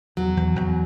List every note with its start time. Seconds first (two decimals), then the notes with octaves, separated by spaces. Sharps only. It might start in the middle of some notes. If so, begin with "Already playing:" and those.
0.17 E2 F#3
0.37 E2
0.56 E2